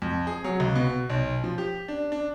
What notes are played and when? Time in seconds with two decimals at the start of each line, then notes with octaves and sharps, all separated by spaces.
0.02 F2
0.27 G#4
0.44 F#3
0.60 C#2
0.75 B2
1.10 B1
1.44 F3
1.58 G4
1.88 D4
2.12 D4